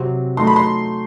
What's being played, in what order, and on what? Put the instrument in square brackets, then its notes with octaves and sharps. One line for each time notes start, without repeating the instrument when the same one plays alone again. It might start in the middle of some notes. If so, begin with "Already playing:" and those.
Already playing: [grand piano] C3 F#3 C4
[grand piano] F#3 A3 D#4 [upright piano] C6
[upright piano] B5
C6